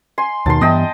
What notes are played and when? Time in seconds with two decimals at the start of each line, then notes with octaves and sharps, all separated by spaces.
0.18 G#5 C6
0.46 D#2 B2 D#3 A5 C6
0.61 G2 E3 B3 D#5 G5 A5